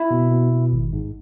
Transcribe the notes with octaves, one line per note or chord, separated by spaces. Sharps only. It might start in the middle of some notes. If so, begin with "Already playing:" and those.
Already playing: E4
B2
B2
B2
G#1
G#2